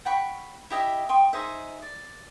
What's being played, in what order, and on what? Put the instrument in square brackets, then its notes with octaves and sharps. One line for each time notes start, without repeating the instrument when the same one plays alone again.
[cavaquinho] F#5 G5 B5 C#6
E4 G4 D#5 E5
G5 C6 C#6 D#6
D#4 G#4 C5 E5
D5